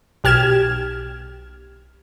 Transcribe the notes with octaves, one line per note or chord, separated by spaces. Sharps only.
B1 G4 F6 G#6 E7